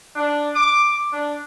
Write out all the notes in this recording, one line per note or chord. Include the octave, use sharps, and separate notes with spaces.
D4
D6
D4